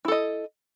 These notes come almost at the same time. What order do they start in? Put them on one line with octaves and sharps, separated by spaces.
E4 A4 D#5